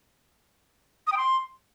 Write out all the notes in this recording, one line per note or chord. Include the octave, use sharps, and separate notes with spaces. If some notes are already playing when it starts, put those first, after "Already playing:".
D#6
G5
C6